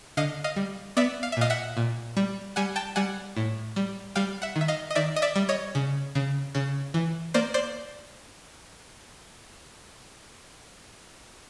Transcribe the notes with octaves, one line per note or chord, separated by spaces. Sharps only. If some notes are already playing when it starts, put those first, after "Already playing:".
D3 D#5 F5
D#5 F5
G3
B3 D5 E5
F5
E5
A#2 D#5 F5
E5 F#5
A#2
G3
G3 F#5 G#5
G5 A5
G3 F#5 G#5
A2
G3
G3 F5 G5
E5 F#5
D#3
E5
D#5 F5
D#5
D#3 D5 E5
D#5
D5 E5
G3
C#5 D#5
C#3
C#3
C#3
E3
A#3 C5 D5
C5 D5